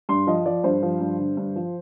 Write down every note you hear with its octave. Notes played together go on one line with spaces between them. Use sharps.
G2 C6
F3 D#5
F3 D5
G2 C5
F3
G2
D3
G2
F3